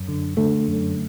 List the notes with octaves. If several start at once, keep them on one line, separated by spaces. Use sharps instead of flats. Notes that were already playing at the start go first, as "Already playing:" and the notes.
Already playing: F#2
D3
D3 A3
F#2